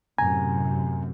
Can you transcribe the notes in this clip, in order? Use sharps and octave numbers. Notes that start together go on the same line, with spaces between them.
F#2 A2 C3 G#5 A#5